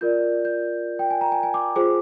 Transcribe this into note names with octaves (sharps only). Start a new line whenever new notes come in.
F4 A#4 D5 G6
G6
G5
G#5
A#5
G#5
G#5
D6
F4 G#4 C5 D6